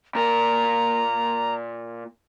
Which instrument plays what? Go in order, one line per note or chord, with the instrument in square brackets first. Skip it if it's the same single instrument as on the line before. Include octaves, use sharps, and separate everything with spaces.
[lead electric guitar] A#2 A#4 [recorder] A#5